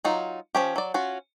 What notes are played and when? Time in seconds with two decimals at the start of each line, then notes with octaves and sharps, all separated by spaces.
0.04 F#3 D#4 F4
0.55 F3 C#4 G4
0.76 F#3 D5
0.94 C#4 F4 F#4